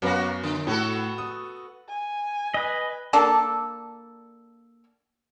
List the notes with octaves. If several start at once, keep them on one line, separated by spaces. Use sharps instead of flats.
F#2 A#3 B3 F#4 A#6
D3
A2 B3 F#4 A4
D#6
G#5
B4 D#5
A#3 D4 A4